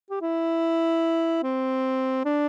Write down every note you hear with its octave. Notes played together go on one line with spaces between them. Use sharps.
G4
E4
C4
D4